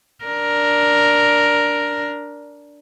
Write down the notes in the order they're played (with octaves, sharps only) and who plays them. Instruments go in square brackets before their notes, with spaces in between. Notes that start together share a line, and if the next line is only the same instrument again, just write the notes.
[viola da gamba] D4 A#4